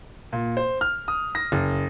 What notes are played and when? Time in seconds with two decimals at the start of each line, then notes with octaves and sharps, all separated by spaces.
0.33 A#2
0.57 C5
0.81 F6
1.08 D#6
1.35 A#6
1.52 F#1